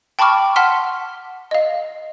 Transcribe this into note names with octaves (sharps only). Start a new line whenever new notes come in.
G5 A5 B5 C#6 D6 F6
F#5 A5 C6 F6 B6
D#5 F5